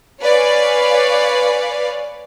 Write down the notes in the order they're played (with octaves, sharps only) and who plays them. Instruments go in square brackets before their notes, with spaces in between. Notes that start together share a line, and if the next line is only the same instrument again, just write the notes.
[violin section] B4 C#5 D5 F5 G#5